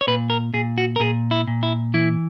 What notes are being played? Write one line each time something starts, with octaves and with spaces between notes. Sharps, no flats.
C#5
A#2 B4
A#4
A#2 G#4
F#4
A#4
A#2 G#4
E4
A#2
E4
E3 E4